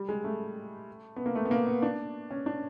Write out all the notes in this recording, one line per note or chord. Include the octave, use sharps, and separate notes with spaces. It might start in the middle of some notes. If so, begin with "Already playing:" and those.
Already playing: G3
G#3
A3
B3
A#3
A3
B3
A#3
B3
D4
C#4
D4